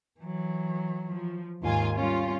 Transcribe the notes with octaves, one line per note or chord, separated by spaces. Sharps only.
E3 F#3
F3
D#2 G#2 F4 G#5
G3 C#4 F4